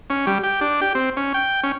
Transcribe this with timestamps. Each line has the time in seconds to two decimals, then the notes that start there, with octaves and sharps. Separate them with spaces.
0.10 C#4
0.27 G3
0.43 G4
0.61 D4
0.81 G4
0.95 C4
1.17 C#4
1.34 G5
1.63 C#4